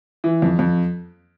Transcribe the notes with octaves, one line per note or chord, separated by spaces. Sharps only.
E3
F2
F2